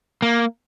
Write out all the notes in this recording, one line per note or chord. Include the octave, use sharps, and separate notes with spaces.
A#3